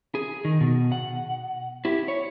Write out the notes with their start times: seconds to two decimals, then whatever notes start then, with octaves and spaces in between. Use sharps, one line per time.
0.15 G#4
0.45 D#3
0.61 B2
0.92 F#5
1.85 E4 G4
2.08 C#5